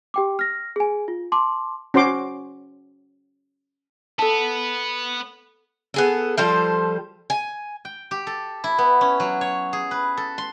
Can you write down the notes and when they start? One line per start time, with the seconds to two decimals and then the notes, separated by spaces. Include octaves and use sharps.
0.14 G4 G5 D6
0.39 F6 A#6
0.76 G#4 G#5
1.08 F4
1.32 A5 C6 D6
1.94 C#4 F#4 C5 C6 D6
4.19 B3 A4 A5
5.94 B3 G#4 A4
6.38 F3 G3 A4 C5
7.30 G#5
7.85 G5
8.11 G4
8.27 A4
8.64 E4
8.78 B3
9.01 C#4
9.20 F#3
9.41 C#5
9.73 G#4
9.91 B4
10.17 A4
10.38 C6